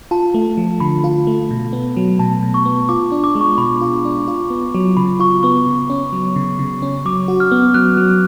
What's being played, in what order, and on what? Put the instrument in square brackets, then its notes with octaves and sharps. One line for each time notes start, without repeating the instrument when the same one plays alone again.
[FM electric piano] F4 [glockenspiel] A5
[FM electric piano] A3
F3
[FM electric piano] D3 [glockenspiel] B5
[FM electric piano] F4
A3
B2
B3
F#3
[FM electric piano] B2 [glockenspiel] A5
[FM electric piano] B2
[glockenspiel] C#6
[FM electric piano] B3
[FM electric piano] F4 [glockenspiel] D6
[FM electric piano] D4
[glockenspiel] D6
[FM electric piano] G#3
[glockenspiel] C#6
[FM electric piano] B2 [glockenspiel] B5
[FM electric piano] F4
D4
F4
B3
F#3
[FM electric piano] C#3 [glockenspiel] B5
[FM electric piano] F4 [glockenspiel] C#6
[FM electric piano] B3 [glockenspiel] C#6
[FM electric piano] C#3
C#4
F#3
C#3
C#3
C#4
[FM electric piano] F#3 [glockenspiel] D6
[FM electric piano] F#4
[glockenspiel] F6
[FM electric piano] B3
[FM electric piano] F#3 [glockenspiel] F#6
[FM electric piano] F#3